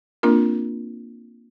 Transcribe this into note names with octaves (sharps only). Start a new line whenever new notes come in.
A#3 C4 D4 F4 A#4